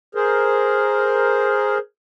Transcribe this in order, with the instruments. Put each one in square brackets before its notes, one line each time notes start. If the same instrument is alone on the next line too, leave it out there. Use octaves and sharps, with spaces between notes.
[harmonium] G#4 A#4 C5